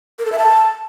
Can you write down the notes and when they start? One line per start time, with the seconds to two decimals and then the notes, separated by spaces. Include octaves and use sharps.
0.19 A#4
0.25 A4
0.32 E5
0.39 A5